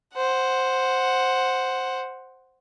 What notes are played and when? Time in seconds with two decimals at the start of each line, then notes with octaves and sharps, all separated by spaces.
0.15 C5 F#5